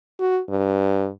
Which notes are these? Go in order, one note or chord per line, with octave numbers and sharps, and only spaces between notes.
F#4
G2